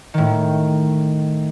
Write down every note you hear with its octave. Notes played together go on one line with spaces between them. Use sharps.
A2 D#3